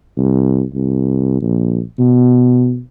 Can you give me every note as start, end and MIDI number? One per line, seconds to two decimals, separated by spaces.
0.17 0.63 36
0.74 1.42 36
1.42 1.81 34
1.99 2.81 47